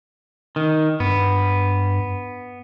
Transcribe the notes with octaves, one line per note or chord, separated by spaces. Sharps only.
D#3
G2 B3